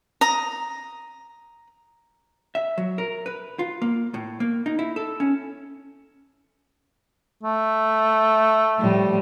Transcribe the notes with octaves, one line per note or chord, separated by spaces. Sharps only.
A#5 D#6
E5
F#3
A#4
B4
F4
A#3
A2
A#3
D#4
E4
A4
C#4
A3
A2 F3 G3